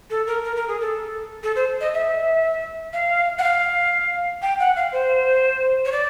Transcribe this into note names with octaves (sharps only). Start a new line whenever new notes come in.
A4
A#4
A#4
A#4
G#4
A4
A4
C5
D#5
E5
F5
F#5
F5
G5
F#5
F5
C5
C#5
D5